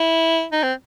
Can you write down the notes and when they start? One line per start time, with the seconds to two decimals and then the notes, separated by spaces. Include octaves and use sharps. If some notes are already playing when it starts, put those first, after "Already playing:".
Already playing: E4
0.52 D#4
0.63 C4